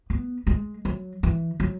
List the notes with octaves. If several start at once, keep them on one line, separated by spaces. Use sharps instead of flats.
B3
G#3
F#3
E3
F#3